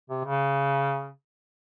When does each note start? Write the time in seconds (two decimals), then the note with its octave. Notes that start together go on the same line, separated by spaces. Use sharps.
0.10 C3
0.24 C#3